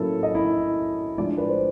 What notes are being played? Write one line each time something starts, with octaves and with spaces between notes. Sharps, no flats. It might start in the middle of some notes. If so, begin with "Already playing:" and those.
Already playing: A2 F#3 A#3 C#4 E4 A4
D#5
E4 E5
A2 F3 G#3 D4 D5
B4
C5